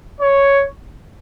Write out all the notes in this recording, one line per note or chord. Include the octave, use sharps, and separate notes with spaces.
C#5